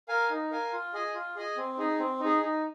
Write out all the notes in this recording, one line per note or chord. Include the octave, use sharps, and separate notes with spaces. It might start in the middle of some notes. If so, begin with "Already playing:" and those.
A#4 F5 G#5
D#4
A#4 F5 G#5
F4
G#4 D#5 G#5
F4
G#4 D#5 G#5
C4
D#4 G#4
C4
D#4 G#4
D#4